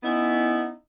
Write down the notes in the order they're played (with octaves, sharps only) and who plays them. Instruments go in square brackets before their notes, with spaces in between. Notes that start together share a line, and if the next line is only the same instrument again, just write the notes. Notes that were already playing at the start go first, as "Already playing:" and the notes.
[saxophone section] B3 C#4 D#4 E4